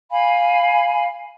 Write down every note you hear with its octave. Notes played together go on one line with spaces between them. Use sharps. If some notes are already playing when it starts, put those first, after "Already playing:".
F5 G#5 B5